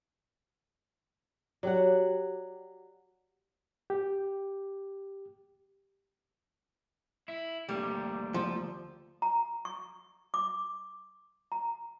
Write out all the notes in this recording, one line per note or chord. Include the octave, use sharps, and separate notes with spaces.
F#3 F#4 G4 D5 F#5
G4
E4 E5
D2 D3 G3 A#3
F3
A#5
C#6
D6
A#5